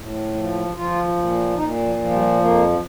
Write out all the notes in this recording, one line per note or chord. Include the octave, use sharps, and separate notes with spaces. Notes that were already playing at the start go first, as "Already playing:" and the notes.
Already playing: A2
F3
F3 F4
A#2
A#2 D#4
F3
F3
G3
F2 A#3